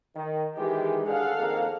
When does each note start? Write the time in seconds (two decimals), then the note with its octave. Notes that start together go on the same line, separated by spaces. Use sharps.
0.15 D#3
0.57 D#3 E3 G#3 G4
1.07 D3 G#4 A4 F5 F#5
1.38 F2 D#3 A#3